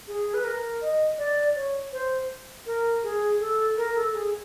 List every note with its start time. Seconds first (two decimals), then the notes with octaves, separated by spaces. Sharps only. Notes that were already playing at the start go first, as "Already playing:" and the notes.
0.08 G#4
0.34 B4
0.44 A#4
0.82 D#5
1.18 D5
1.55 C#5
1.93 C5
2.66 A#4
3.03 G#4
3.40 A4
3.77 A#4
3.95 A4
4.14 G#4